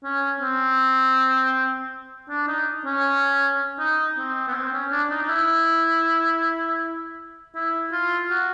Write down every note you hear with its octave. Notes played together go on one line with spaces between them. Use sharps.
C#4
C4
D4
D#4
C#4
D#4
C4
B3
C4
C#4
D4
D#4
D#4
E4
E4
F4
F#4